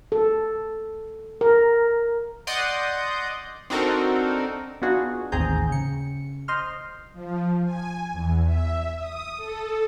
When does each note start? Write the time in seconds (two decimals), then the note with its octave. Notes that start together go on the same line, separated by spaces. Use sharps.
0.12 A4
1.41 A#4
2.47 D5 D#5 F#5 C6 D#6 G6
3.70 C4 D4 D#4 F#4 A4 A#4
4.82 B3 D4 D#4 F4 F#4 G#4
5.32 A1 D#2 C4 G#4 A#5 G6
5.69 C#3 C#7
6.48 C5 D#5 C6 F6
7.13 F3
7.64 G#5
8.12 E2
8.44 E5
8.97 D#6
9.37 A4